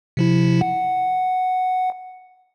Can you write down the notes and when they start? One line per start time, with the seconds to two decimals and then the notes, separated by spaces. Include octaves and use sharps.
0.17 C3 F3 E4
0.61 F#5